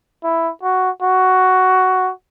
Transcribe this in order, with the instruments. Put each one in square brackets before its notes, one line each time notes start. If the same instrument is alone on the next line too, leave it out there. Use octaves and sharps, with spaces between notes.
[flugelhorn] E4
F#4
F#4